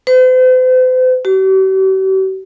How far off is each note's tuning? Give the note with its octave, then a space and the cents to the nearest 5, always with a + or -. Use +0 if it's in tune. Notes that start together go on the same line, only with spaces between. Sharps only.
C5 -45
G4 -45